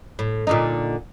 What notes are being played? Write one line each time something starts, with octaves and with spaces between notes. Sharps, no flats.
A2
A#2 D3 D#4